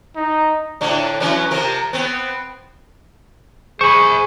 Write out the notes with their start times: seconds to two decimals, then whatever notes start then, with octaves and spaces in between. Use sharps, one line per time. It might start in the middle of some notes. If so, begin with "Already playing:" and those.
0.16 D#4
0.81 A2 D3 F3
1.20 E3 F#3 C#4
1.51 C3 F3 A#4
1.93 B3 C4
3.81 G#4 C5 B5 C#6